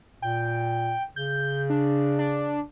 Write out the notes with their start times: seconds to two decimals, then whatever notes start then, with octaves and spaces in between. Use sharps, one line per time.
0.22 A#2 G5
1.16 C#3 G6
1.70 D4
2.19 D4